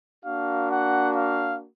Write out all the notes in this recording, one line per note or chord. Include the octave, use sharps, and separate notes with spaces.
A#3 D4 F#4 F5
F#5
F5